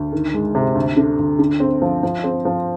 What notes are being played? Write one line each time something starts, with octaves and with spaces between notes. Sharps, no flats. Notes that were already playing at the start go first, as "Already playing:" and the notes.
Already playing: D2
D#3
G#3
C3
D2
D3
D2
D3
C4
F3
F3
C4
F3